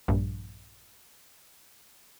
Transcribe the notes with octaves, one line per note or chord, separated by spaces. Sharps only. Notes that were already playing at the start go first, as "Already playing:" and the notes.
A#1 G2